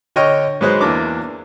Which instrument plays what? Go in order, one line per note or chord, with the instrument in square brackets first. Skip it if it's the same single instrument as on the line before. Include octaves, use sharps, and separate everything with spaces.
[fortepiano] D3 C#5 D#5 G5 C#6 F6
G#2 F#3 G#3 B4 C5 F#6
E2 E3 A#3 D4 D6